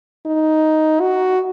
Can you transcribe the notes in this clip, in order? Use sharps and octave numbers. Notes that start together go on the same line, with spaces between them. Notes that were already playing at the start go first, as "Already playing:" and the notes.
D#4
F#4